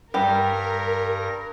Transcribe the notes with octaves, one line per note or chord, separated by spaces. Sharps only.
G2 G3 G4 A#4 A#6